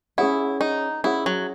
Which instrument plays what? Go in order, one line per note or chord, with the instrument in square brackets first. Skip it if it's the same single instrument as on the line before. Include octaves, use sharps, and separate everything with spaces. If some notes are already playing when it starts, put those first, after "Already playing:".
[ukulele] C#4 G#4 C#5 F#5 [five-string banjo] E4
[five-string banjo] D#4
[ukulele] C#4 G#4 C#5 F#5 [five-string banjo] E4
[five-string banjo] F#3